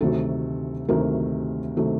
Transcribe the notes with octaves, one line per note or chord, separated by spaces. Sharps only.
D2 C3 D#3 F#3 A3 A4
D2 C3 D#3 F#3 A3 A#4
C3 D#3 F#3 A3